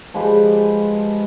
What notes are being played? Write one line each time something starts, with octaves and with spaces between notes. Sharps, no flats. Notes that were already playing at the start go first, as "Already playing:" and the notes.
F3 G#3 G4 B4